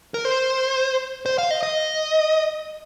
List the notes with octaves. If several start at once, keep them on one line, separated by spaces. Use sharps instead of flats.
A#4
C5
C5
F5
D#5
D#5